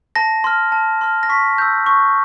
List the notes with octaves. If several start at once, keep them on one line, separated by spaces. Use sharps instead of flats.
A5 A#6
C6 F6
A5
C6 F6
A#6
C#6 B6
E6 G6
C#6